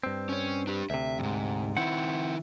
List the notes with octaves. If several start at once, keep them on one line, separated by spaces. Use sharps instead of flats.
G2 C4
C#4 C#5
D4 G4
D2 C3 E5
F2 G#2
D#3 C4 E4 F#5